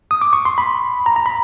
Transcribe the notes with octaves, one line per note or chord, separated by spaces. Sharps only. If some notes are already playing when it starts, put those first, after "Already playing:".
D#6
D6
C#6
C6
B5
A#5
A#5
B5